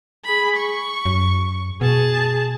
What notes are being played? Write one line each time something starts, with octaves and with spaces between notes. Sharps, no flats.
G#4 B5
C#6
F#2
B2 G#4 A5